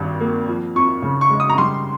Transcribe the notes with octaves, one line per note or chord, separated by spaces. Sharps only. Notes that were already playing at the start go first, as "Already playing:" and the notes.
Already playing: G#1 G2 D#3
A#3
F3
F2 C#6
C#3
C#6
G#3
D#6
A#5
G3 C6